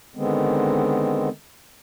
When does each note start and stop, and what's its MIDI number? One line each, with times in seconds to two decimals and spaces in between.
0.16 1.29 50
0.16 1.29 51
0.16 1.29 56
0.16 1.29 59
0.16 1.29 60